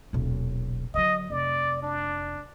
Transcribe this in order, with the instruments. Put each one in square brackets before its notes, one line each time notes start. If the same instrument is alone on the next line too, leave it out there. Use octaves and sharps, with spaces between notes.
[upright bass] D#1 B1
[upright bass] D3 F#3 [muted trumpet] D#5
[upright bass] F1 [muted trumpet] D5
[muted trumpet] D4